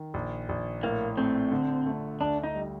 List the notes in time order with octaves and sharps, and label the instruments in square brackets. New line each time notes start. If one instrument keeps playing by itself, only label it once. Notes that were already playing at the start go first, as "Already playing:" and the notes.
Already playing: [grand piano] D#3
A#1
A#1
[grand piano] A2 [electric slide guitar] A#3
[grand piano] A3 [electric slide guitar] C4
[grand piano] D3
A3
[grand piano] D2 [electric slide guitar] D4
[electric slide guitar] D#4
[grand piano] G3